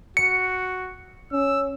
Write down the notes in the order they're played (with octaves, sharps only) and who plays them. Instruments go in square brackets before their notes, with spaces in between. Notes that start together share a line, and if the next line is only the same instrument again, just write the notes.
[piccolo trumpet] F#4 [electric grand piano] C#7
[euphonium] C#4 [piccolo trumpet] E6